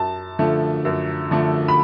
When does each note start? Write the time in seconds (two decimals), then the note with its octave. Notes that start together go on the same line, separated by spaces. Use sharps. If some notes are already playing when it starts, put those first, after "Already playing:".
Already playing: F#2 A5
0.39 D3 F3 A3
0.85 F#2
1.31 D3 F3 A3
1.68 B5